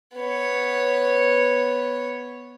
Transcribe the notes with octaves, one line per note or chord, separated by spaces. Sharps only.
B3 C#5